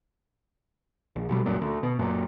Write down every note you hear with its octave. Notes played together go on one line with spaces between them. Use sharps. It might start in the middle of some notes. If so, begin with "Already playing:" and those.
A#1
B1 B2 G3
C#2 F#2 A#2
D2
B2
F#1 F#2 A#2